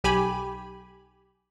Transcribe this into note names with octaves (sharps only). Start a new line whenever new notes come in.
B1 G4 G#5 B5